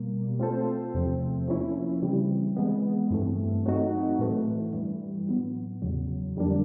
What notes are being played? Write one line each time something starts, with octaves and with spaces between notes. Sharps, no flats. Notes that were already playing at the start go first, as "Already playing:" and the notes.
Already playing: B2 G3 A#3
A3 C4 F4 A4 C5
E2 C3 F3 A3 C4
F3 A#3 C#4 E4
C#3 E3 G3 C4
E3 G#3 B3
G2 E3 A3 C4
F#3 A3 C4 D#4 F#4
A2 E3 A3
G2 E3 G3
A2 F#3 B3
E2 C#3 F#3
F2 D3 G3 A#3 D4